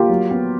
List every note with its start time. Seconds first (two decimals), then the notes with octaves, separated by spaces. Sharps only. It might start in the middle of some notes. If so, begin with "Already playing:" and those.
Already playing: A#3 F4 G4
0.09 F#3
0.31 B3